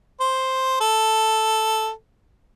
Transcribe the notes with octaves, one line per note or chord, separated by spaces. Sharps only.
C5
A4